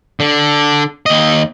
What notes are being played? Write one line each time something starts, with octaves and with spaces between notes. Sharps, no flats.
D3
D#2 D#5